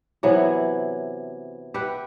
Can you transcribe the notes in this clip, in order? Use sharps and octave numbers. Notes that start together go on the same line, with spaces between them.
C3 E3 F#3 B3
G4 B4 E5 F#5